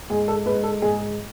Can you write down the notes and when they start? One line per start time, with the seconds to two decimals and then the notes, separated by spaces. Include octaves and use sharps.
0.10 G#2 G#4
0.28 A4
0.46 G#2 B4
0.64 A4
0.82 G#2 G#4